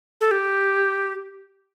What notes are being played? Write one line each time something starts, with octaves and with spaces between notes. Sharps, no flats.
A4
G4